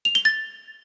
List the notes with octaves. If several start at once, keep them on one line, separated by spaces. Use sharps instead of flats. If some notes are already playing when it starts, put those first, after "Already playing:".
F7
G7
A6